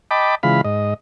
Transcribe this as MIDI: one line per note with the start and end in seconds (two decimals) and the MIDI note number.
0.11 0.35 75
0.11 0.35 79
0.11 0.35 81
0.11 0.35 83
0.11 0.35 86
0.43 0.61 49
0.43 0.61 52
0.43 0.61 56
0.43 0.61 65
0.43 0.61 77
0.43 0.61 83
0.65 0.94 44
0.65 0.94 75